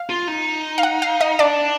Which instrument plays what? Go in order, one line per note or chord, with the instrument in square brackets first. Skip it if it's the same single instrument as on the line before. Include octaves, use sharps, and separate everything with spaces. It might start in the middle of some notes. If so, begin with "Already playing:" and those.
Already playing: [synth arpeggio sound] F5
[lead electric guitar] F4
D#4
[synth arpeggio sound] F5
F#5
F5
D#5
[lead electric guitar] D4 [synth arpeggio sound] D5